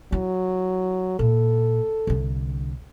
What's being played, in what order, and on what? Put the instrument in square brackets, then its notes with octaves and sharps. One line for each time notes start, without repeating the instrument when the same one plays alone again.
[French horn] F#3 [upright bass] E4
[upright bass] A#2 [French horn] A4
[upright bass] C2 D3